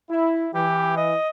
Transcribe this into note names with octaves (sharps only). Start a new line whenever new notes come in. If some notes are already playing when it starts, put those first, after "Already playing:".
E4
E3 G4
D#5